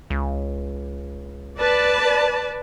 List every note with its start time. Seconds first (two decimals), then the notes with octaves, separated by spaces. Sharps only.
0.10 C#2
1.58 B4 D5 A5